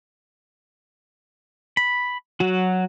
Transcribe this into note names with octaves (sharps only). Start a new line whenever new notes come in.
B5
F#3 F#4